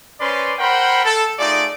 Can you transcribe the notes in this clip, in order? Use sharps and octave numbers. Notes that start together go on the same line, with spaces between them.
C#4 B4 C5 D5 C6
A#4 C5 F#5 G5 B5 C6
A4
A3 D#4 F4 G#4 D5